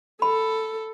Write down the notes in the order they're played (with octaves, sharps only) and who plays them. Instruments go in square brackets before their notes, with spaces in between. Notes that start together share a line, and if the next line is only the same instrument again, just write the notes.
[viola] A4 [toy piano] B5